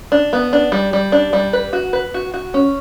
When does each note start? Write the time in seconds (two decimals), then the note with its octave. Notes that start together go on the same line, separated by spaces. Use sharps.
0.12 D4
0.33 B3
0.53 D4
0.72 G3
0.93 G3
1.12 D4
1.33 G3
1.53 B4
1.73 F#4
1.93 B4
2.14 F#4
2.34 F#4
2.54 C#4